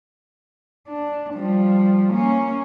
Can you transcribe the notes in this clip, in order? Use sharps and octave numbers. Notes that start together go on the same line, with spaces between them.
D4
F3 G3
A#3 C#4